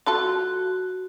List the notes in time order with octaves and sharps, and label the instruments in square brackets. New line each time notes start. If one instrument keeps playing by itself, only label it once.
[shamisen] F#3 F4 A4 [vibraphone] F#4